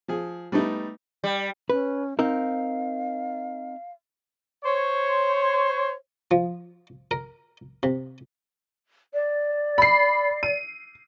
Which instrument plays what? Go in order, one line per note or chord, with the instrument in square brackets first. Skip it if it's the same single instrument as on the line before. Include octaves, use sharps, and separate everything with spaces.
[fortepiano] F3 G#4
G3 A3 B3 D#4
[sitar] G3
[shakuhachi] C#4 [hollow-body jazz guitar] B4
[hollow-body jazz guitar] C4 D#4 A#4 [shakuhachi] F5
[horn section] C5 C#5
[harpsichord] F3
A#4
C3
[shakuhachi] D5
[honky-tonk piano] B5 C7
D#7